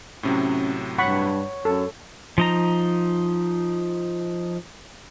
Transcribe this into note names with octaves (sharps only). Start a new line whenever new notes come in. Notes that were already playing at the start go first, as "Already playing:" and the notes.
A2 C3 F#3 C#4
G2 C#5 F#5 B5 C#6
F#2 A4
F3 D#4 A#5